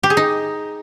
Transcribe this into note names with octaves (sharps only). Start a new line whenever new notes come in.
G4
G#4
D#4